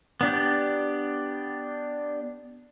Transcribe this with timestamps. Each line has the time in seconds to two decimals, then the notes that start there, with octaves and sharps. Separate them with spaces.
0.21 B3 D4 G4